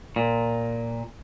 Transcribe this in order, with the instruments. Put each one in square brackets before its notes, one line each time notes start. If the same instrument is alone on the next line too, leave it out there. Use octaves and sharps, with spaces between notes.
[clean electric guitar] A#2